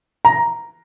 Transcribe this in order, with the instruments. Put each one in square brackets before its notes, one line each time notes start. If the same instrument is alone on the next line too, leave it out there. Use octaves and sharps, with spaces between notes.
[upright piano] A#5